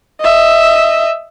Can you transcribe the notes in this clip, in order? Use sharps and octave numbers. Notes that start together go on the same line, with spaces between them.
D#5 E5